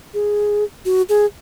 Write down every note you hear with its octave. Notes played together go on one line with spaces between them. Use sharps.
G#4
F#4
G#4